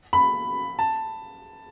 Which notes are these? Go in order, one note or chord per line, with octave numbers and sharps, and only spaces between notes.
B5
A5